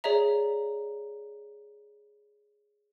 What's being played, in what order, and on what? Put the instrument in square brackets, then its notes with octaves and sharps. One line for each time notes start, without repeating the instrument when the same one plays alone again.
[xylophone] G#4 C#5 D5 E5 A#5